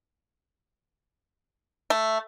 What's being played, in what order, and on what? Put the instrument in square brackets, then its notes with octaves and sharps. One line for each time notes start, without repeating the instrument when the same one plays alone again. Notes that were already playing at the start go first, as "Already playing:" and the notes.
[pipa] A3